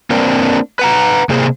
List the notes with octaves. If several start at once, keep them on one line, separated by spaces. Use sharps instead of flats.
A#3 C4 D4 A#4 C5 G5
B4 F#5 A#5
C3 A#3 G#4 C5